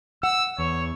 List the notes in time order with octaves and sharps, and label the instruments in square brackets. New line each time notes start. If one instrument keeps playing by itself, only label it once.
[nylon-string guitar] F#5 [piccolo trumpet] E6
[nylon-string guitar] E2 [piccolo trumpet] C#5